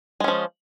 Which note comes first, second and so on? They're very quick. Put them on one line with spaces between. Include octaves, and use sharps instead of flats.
G#3 C#4 F3